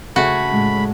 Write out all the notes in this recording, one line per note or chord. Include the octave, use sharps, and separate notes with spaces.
C#3 A3 C#4 F#4 B5
A2 G#3